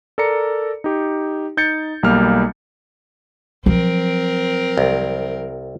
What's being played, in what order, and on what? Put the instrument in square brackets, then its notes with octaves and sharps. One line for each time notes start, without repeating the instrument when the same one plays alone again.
[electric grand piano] A4 A#4 D5 A#5 C#7
D#4 G4
D#4 G6 A6 C#7
B1 G3 A#3 F6
[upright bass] F3 F#3 [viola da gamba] C4 A#4
[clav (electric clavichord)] C2